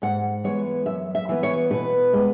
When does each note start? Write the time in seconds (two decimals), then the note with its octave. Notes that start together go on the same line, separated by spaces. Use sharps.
0.02 G#2 F#5
0.44 E3 G#3 B3 C#5
0.86 F#2 E5
1.15 E5
1.29 E3 B3
1.43 C#5
1.71 B2 B4
2.13 G#3 B3